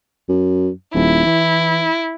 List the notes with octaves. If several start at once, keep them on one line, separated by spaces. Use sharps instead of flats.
F#2
D#1 E4
E3